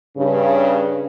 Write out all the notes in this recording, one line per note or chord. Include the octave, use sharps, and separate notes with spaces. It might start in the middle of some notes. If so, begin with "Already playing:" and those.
G2 C#3